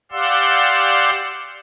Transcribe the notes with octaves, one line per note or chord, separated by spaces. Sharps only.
G4 D5 F5 F#5 C6 E6